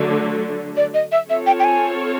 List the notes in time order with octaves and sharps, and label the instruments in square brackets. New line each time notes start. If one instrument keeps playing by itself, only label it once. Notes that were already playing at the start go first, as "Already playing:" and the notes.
Already playing: [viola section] D3 F#3 A3 D4
[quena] D5
D#5
E5
[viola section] C4 F4 A4 C#5 [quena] E5
[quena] G5
G5
G#5